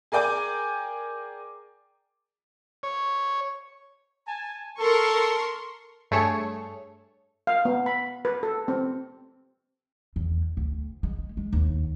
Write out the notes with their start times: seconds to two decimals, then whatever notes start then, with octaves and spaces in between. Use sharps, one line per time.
0.12 G#4 A#4 D5 G5 G#5 D6
2.83 C#5
4.26 G#5 A5
4.79 A4 A#4 C6 C#6
6.11 G2 A3 G#4 A4 C#5 C#6
7.47 F5
7.65 B3
7.86 B5
8.25 B4
8.43 A4
8.68 C4
10.16 E2
10.57 D2
11.03 G#3
11.37 G#3
11.52 D#2